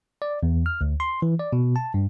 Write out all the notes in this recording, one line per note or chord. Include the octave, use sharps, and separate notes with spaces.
D5
E2
F6
D2
C6
E3
D5
B2
A5
G2